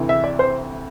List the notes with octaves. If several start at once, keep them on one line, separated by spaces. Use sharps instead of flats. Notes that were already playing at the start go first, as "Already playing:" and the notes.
Already playing: D2 C3 E3
E5
D5
C5